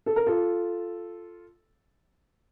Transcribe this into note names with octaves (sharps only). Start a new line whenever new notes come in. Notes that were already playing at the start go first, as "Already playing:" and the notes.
A4
A#4
F4 A4